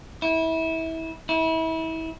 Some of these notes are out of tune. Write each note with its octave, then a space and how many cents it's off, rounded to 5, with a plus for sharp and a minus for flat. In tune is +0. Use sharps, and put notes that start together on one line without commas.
E4 -25
E4 -30